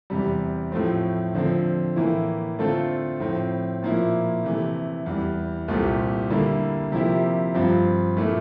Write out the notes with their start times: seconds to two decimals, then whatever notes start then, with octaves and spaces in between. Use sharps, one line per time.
0.10 E2 C3 G3
0.72 A2 F3 A3 C4
1.35 D3 F3 C4
1.96 A2 E3 A#3 E4
2.58 D3 A3 C4 F4 A4
3.20 A2 F3 C4
3.82 A#2 F3 A#3 E4
4.44 C3 E3 A3
5.06 E2 E3 G3
5.68 C2 A#2 A3 C4 G4
6.30 D3 G3 A#3 E4
6.92 C3 F3 A#3 E4 G4
7.54 G2 F3 C4 F4
8.17 A#2 A3 E4